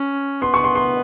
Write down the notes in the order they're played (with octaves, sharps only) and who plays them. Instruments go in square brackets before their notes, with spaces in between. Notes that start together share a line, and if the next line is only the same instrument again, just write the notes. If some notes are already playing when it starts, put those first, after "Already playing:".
Already playing: [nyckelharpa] C#4
[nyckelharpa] B3 [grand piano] C6
[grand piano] C#6
C6
C6